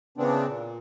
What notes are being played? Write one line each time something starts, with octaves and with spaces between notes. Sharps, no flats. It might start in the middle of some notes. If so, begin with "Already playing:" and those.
C#3 E3 B3 C4 D4
A#2